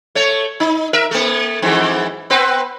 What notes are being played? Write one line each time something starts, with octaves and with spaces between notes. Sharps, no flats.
A3 C#5
D#4
A#4 E5
A3 A#3
F2 G#2 E3
B3 C4 B4